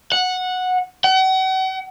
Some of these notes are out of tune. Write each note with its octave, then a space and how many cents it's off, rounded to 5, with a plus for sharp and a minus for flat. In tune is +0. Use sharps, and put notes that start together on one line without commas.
F#5 -10
F#5 +40